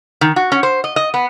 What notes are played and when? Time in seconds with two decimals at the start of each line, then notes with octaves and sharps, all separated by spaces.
0.21 D#3
0.36 F#4
0.52 C#4
0.63 C5
0.84 D#5
0.96 D#5
1.14 B3